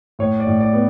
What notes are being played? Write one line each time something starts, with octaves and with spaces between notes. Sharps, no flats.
A2 C#5
D5
A2
D5
B3